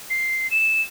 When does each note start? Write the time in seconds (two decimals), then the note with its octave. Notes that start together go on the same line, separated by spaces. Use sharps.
0.10 C7
0.51 E7